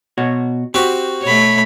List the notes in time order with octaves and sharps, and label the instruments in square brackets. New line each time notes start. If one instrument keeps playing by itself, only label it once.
[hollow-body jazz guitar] B2 F#4 C#5
[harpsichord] C4 F#4 [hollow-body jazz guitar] G4
[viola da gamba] B2 A3 [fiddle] C#5 B5